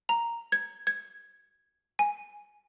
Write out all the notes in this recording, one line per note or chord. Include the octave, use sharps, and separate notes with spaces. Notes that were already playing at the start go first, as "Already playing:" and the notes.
A#5
G#6
G#6
G#5